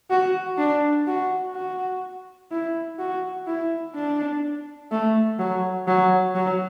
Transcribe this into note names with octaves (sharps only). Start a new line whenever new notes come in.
F#4
D4
F#4
F#4
E4
F#4
E4
D4
A3
F#3
F#3
F#3